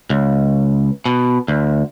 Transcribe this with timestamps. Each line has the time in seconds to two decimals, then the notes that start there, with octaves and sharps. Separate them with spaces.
0.10 C#2
1.06 B2
1.48 D2